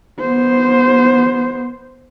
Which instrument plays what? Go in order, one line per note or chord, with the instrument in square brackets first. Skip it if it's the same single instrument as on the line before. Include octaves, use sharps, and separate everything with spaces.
[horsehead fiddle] B3 C5